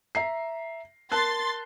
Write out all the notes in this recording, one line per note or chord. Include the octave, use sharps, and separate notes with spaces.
E5 A#5 C7
A#4 A5 C6 F#6 A6